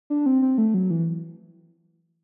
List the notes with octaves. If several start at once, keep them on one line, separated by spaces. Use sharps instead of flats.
D4
C4
C4
A3
F#3
E3